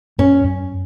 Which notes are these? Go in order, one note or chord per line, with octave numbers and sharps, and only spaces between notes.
F#2 C#4
F#2